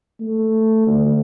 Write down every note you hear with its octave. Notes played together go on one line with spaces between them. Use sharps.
A3
D2